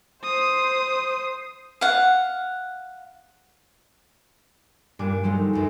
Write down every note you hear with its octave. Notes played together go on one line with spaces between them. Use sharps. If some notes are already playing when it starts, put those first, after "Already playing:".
C5 D#6
F5 F#5
G2 A#2 G3 D4 G#5 D6
F3 F#3 G#3 A3 D#4
C#2 F#2